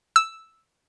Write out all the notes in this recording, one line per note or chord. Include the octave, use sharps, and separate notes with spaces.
E6